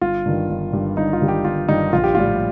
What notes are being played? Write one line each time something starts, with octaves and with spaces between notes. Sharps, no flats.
G1 F4
G2 D#3 G3
G1
G2 D#3 G3
G1 D#4
F4
G2 D#3 G3
G4
G1 F4
G2 D#3 G3 D#4
A#1 F4
G4
A2 G3 F4